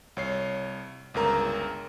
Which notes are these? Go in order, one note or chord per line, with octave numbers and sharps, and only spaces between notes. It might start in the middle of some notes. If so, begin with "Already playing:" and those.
C2 C#5 C7
G1 C#2 A#4 A#5